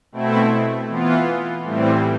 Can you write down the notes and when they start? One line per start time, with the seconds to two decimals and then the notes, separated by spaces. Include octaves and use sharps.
0.12 B2 A3 C4 E4
0.88 E3 B3 F4
1.64 A2 E3 G3 C4